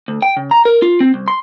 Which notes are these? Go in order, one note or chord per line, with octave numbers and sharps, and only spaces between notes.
D2
G5
C#3
A#5
A#4
F4
C4
C2
C6